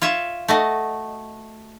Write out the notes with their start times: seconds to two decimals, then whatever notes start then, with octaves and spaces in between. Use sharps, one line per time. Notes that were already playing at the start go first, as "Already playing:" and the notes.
0.02 F4 C#5 E5
0.48 A3 F#4 D#5